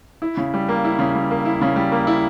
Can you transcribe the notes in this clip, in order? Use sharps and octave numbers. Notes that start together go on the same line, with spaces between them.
E4
C#3
G3
A#3
E4
C#3
G3
A#3
E4
C#3
G3
A#3
E4